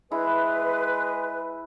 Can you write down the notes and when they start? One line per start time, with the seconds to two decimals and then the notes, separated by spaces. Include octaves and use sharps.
0.12 G#3 E4 B4